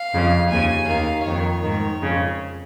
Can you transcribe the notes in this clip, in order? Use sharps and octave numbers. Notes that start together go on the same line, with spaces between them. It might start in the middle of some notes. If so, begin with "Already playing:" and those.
Already playing: F5
F2 C#3
D#2 C#3 G#5
D#2 D#3 F5
F2 D#3 C#5
G#2 D#3
F2 C#3